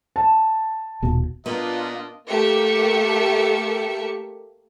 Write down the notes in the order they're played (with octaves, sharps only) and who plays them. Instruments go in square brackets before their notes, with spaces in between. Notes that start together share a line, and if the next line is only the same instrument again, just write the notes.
[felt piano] A5
[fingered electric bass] D#1 B2
[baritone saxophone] A#2 [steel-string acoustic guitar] B3 [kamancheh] D4 F4 [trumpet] D#5
[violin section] A3 A#3 G4 E5 C#7